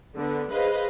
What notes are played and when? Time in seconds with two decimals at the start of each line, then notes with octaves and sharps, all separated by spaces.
0.16 D3 B3
0.52 G#4 B4 C5 D#5 F5